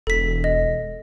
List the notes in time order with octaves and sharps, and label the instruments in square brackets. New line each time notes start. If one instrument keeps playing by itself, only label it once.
[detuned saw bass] E1 [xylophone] A4 B6
[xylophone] D#5